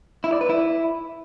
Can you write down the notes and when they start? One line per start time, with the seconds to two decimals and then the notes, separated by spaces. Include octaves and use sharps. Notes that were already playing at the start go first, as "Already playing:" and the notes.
0.24 E4
0.32 D5
0.41 B4
0.49 E4